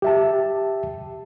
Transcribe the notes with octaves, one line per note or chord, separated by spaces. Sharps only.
G4 E5 A5